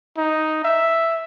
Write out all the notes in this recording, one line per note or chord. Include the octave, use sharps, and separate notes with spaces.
D#4
E5